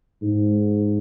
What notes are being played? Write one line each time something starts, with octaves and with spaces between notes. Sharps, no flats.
G#2